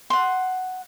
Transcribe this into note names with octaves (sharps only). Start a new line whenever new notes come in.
F#5 C6